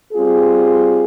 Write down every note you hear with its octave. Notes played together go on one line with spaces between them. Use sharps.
G3 C4 F4 G#4